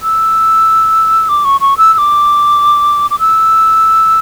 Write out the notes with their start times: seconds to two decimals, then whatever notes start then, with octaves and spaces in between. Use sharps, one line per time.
0.03 E6
1.29 D6
1.45 C#6
1.61 C#6
1.78 E6
1.93 E6
1.98 D6
3.11 D6
3.19 E6